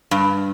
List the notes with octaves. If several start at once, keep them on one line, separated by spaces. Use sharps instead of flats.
G2